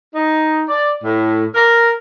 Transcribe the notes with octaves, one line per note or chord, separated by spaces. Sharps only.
D#4
D5
A2
A#4